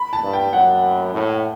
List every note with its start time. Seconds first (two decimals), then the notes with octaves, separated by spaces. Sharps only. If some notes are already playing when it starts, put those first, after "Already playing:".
Already playing: B5
0.13 A5
0.23 G2
0.33 G5
0.53 F#2 F#5
1.14 A2